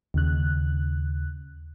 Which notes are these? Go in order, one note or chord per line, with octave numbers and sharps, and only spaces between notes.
D#2 C#3 F#6